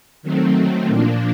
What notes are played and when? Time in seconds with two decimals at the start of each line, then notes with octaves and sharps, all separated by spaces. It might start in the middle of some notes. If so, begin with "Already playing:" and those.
0.23 D#3 F#3 A3 C4
0.87 A#2 F3 A#3 D4